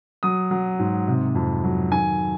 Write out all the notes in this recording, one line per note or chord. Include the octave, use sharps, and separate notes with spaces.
F#3 D#6
F#3
G#2
C3
F2
F#3
D#3 G#5